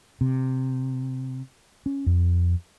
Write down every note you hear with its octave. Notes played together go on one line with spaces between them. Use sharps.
C3
C#4
F2